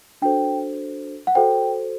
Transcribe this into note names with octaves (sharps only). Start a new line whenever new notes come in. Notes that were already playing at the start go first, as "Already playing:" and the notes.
D4 F#4 A4 C5 G5
F#5
F#4 A4 C5 G5